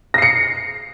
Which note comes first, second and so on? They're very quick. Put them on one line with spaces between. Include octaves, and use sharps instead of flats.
A#6 C7 C#7